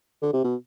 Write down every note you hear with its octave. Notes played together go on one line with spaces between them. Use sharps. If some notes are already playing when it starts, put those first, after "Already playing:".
D3
C3
B2